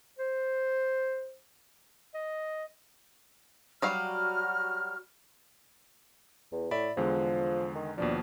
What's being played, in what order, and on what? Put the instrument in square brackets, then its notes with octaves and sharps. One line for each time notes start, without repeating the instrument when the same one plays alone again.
[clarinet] C5
D#5
[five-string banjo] F#3 G3 F5 [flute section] F#4 F6
[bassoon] E2
[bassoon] A2 [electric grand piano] D5 E5 B5
[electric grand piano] E2 D3 G#3 [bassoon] F3
[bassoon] D#3
[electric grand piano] D#2 B2 F3 [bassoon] D4